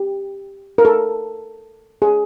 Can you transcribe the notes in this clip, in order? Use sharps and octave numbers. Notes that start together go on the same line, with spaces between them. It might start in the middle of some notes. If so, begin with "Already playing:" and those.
Already playing: G4
A#4
A4
G#4